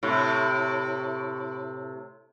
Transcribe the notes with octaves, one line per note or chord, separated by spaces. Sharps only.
A2 C3